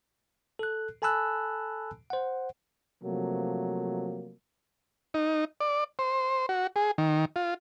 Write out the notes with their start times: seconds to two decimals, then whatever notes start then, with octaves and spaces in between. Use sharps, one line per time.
0.59 A4 F#6
1.02 A4 G#5 A5 B5 E6 F#6
2.10 C5 F#5
3.03 C3 F3 F#3 A3 A#3
5.14 D#4
5.61 D5
5.99 C5
6.49 F#4
6.76 G#4
6.98 D#3
7.36 F4